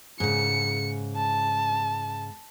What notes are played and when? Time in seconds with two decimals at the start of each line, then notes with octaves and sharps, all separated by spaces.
0.20 G#2 C#3 C#7
1.17 A5